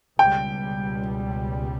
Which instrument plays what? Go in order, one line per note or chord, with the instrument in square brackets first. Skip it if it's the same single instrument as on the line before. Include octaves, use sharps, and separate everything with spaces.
[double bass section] C#2 B2 G3 [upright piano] G5